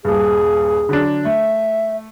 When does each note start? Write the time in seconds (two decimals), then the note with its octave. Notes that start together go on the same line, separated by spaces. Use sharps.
0.05 D#1 G2 G#4
0.89 D3 F#3 D4
1.25 A3 E5